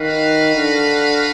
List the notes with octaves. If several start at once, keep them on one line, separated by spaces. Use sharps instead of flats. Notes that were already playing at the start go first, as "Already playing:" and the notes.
Already playing: D#3 F#4 B4 F5
D3